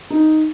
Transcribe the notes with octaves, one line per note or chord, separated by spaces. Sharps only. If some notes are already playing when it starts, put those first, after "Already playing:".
D#4